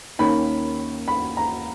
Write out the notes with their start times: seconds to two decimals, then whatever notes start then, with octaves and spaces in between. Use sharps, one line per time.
0.19 D#2 D#3 A#3 C#4 B5
1.08 B5
1.37 A#5